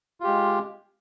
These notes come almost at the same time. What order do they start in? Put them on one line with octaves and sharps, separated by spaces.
F4 G4 G#3